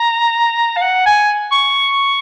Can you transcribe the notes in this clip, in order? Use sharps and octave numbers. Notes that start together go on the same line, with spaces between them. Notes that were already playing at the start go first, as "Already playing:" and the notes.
Already playing: A#5
F5
F#5
G#5
C#6